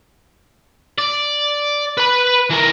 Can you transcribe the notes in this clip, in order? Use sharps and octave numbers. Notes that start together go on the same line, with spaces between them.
D5
B4 B5
E3 A#4